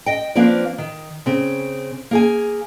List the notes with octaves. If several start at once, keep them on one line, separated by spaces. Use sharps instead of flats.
D#5 G5
F3 A#3 C4 D4 B4 D5
D#3
C#3 C4
A#3 G#4 G#5